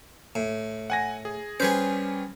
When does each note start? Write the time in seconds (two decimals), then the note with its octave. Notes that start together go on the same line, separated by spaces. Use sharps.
0.35 A2
0.90 F#5 G#5 A#6
1.25 G#4
1.60 G3 C#4 G#4 B4 C5